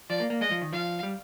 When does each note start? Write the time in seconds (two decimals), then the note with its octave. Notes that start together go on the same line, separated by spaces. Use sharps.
0.09 F3 D5
0.20 A#3
0.30 A#3
0.41 G#3 D#5
0.51 F3
0.62 D#3
0.73 F3 F5
1.03 G3